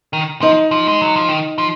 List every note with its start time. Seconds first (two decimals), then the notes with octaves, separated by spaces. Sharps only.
0.13 D#3
0.41 F3 D#4
0.71 F3
0.88 G#3
1.02 F#3
1.16 F3
1.29 D#3
1.58 F3